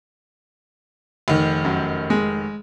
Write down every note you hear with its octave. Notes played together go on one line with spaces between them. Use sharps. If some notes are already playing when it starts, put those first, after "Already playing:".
F1 D#3
F#2
G#3